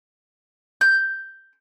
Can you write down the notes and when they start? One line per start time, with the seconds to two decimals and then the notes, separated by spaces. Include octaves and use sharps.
0.81 G6